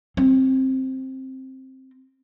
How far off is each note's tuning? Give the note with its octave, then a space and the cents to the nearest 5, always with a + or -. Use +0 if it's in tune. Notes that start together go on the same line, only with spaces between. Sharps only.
C4 +10